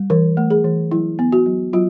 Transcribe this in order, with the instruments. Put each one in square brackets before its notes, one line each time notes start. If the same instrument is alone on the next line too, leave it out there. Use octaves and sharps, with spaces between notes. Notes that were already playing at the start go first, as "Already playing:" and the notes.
Already playing: [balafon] G3
E3 A#4
A3
G#4
E3
F#3 E4
B3
F#4
F#3
F#3 F4